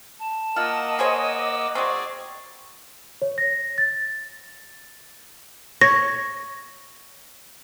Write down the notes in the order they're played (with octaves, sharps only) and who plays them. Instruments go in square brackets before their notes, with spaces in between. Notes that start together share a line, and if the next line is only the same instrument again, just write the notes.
[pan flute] A5
[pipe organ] A#3 F#5 E6 [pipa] F4 [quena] D#5
[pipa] G#4 C5 C#5
[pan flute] D6
[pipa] F#3 C4 [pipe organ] G#4 D5 [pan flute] C#6
[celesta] C#5
A#6
A6
[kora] C#5 [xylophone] A#6